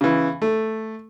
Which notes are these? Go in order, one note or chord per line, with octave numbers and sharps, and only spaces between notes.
C#3 E3
A3